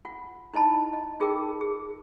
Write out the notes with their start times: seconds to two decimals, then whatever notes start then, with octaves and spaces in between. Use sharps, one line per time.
0.05 F4 F#5
0.54 D#4 E4 D#5 A5 B5
0.93 D#5
1.20 D#4 F4 G#4 A#4 G5 D6
1.61 G#4